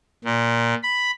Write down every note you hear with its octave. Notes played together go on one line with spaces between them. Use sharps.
A#2
B5